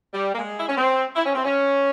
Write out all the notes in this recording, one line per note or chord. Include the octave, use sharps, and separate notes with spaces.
G3
A#3
G#3
E4
C#4
C4
E4
C#4
C4
C#4